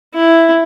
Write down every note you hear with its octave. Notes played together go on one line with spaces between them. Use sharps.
E4